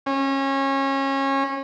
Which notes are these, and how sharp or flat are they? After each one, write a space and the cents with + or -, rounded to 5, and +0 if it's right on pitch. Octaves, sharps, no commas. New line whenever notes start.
C#4 -25